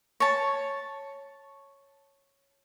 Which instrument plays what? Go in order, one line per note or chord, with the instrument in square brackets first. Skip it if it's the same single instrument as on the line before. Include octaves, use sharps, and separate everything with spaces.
[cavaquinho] C#5 A5